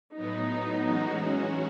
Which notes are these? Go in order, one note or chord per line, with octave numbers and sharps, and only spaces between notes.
A2 F#3 B3 D#4
E3 G#3 C#4 F#4
C#4